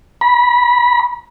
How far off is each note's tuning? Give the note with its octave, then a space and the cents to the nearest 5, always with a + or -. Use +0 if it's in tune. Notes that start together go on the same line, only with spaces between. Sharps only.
B5 -30